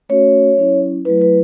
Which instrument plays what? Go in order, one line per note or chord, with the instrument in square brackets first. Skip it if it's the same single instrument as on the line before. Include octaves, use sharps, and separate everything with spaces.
[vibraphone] A3 C#4 F#4 C#5
F#3 C#4 E4
F#3 A3 E4 B4
B4